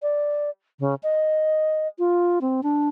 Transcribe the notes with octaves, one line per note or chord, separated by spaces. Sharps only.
D5
C#3
D#5
F4
C4
D4